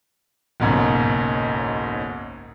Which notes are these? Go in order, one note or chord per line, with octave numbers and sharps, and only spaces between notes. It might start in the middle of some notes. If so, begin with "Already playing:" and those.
F#1 B1 G#2 C#3